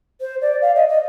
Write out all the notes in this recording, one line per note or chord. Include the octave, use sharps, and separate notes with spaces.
C5
D5
F5
D#5
D#5